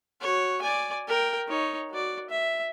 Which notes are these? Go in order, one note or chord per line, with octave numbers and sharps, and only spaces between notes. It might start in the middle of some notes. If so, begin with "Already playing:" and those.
F#4 C#5
D5 G#5
A#4 G5
D#4 C#5
F#4 D5
E5